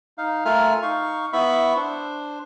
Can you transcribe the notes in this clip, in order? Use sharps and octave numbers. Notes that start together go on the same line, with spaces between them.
D#4 F5
A3 F4 A#4 E5 G#5 F6
D#4 F5 C#6
B3 E4 E5 B5 C#6
D4 C5